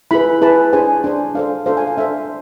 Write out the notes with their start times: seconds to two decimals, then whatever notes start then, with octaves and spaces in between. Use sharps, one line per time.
0.11 E4 G#4 B4 B5
0.41 E4 G#4 B4 A5
0.73 D4 G#4 C5 G#5
1.04 D4 G#4 C5 G#5
1.35 D4 A4 C5 F5
1.66 D4 A4 C5 F5
1.77 G#5
1.87 F5
1.97 D4 A4 C5 E5